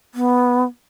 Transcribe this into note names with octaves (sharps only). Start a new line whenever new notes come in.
B3